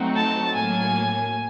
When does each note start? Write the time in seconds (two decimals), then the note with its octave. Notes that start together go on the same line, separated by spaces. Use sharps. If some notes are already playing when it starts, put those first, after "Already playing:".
Already playing: F#3 A3 C4 D#4 F#4
0.16 A5
0.55 A2 F#3 A#3 G#5